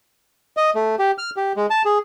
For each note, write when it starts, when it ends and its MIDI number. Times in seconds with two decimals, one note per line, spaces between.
0.57 0.70 75
0.75 0.95 57
0.99 1.11 67
1.18 1.30 89
1.37 1.53 67
1.57 1.66 56
1.70 1.82 81
1.86 1.98 68